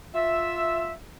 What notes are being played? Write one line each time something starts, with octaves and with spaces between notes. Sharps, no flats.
F4 E5